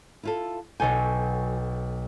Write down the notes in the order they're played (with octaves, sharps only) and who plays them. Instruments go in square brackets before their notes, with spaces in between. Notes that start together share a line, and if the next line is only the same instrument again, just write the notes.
[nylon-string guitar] E4 F4 A4
[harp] B1 A4 G5 [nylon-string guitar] F#3 G#5